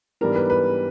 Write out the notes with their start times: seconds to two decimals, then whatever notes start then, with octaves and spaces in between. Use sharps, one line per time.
0.21 G#2 E3 G3 B3 D4 A#4
0.35 B4
0.50 B4